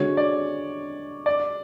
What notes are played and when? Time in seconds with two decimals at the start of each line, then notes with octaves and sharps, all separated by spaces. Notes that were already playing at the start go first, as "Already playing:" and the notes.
Already playing: D3 G#3 D4 F#4 C#5
0.17 D5
1.26 D5